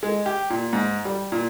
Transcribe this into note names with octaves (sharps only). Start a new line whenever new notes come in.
G#3
G4
A#2
G#2
G3
A#2